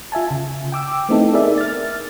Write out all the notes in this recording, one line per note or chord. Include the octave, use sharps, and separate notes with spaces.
F4 E5 G#5 A5
C#3
G5 D6 E6
A3 B3 C4 D#4 E4 A4
D#4 G#4 A#4 D5 E5
F6 A6